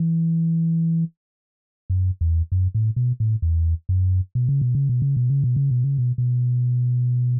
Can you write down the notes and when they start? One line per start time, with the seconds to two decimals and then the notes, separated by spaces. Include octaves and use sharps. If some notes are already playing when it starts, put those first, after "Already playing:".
Already playing: E3
1.90 F#2
2.21 E2
2.52 F#2
2.75 A2
2.96 B2
3.20 A2
3.42 E2
3.89 F#2
4.35 B2
4.49 C#3
4.61 B2
4.75 C#3
4.89 B2
5.02 C#3
5.17 B2
5.30 C#3
5.44 B2
5.56 C#3
5.71 B2
5.84 C#3
5.98 B2
6.18 B2